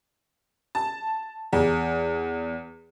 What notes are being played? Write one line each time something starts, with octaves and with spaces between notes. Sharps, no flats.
A5
E2